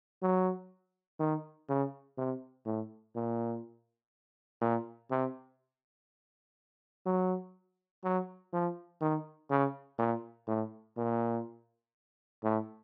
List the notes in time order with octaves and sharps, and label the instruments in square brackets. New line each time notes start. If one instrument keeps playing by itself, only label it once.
[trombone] F#3
D#3
C#3
C3
A2
A#2
A#2
C3
F#3
F#3
F3
D#3
C#3
A#2
A2
A#2
A2